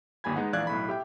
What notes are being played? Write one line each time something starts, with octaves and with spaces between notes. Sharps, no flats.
G1 D#2 G3 G#5 B5 G#6
G#3 B3 D#4 F#5
A#1 E2 D5 F5 F#6 G#6
B1 A2 B5
G4 E5 G5